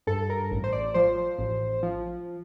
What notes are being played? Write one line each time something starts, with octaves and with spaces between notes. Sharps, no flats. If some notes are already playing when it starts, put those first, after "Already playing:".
G2 A4
A#4
A1
C5
D5
F3 C5
A1
F3